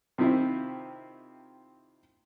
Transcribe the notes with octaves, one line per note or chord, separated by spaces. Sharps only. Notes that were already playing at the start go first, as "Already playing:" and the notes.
C3 D#3 C4 E4 F4